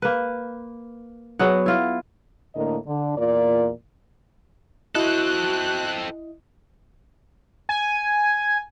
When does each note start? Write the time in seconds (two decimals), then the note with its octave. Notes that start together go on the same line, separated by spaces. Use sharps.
0.02 A#3 B4
1.39 F#3 B3 G#4 F#5
1.66 E4 F4
2.55 A2 D3 A#3 A#4 D#5
2.86 D3
3.16 E2 A#2 A#3 F4 A#4 D5
4.95 C4 E4 F#4 A4 D#5 F#6
7.69 G#5